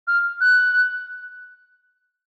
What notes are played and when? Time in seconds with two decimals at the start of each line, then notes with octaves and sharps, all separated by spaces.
0.07 F6
0.41 F#6